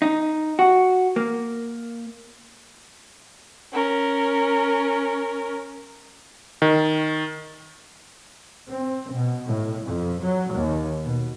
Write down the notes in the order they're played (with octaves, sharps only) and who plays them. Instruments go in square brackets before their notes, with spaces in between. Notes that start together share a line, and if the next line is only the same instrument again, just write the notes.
[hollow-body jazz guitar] D#4
F#4
A#3
[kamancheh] C#4 A#4
[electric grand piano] D#3
[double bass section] C4
B2
A2
F2
F#3
D#2
B2